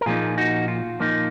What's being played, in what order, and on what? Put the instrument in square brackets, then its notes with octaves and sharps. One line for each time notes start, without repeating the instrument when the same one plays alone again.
[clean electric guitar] A#4
A#2 F3 A#3 D#4 F4 G#4
D#4 F#4
F4
A#2 F3 A#3 D#4